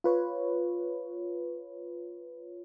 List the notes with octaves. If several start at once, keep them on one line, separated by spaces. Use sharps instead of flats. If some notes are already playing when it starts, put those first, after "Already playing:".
F4 B4 C#5